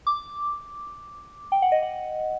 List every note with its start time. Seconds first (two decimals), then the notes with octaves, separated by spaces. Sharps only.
0.07 D6
1.52 G5
1.62 F#5
1.72 D#5
1.82 F#5